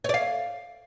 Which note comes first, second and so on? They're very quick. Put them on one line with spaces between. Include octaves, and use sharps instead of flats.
C#5 D5 F5